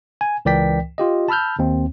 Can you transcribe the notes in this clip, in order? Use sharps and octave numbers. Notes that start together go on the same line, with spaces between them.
G#5
C#2 E3 A#4 D5 G5 B6
F4 G4 D#5
A5 B5 E6 F6 G6
D#2 C4